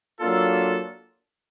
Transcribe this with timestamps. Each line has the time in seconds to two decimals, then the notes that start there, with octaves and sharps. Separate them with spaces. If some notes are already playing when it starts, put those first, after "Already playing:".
0.19 F#3 A#3 D4 F4 A4